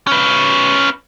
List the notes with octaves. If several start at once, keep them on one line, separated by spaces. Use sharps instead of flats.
C#4 B4